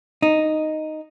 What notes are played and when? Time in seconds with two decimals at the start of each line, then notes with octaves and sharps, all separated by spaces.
0.22 D#4